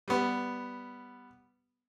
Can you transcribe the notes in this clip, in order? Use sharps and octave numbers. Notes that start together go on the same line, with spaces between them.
G3 B3